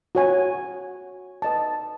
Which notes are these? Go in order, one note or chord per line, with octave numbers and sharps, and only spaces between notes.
F#4 C#5 G#5
B4 D#5 A5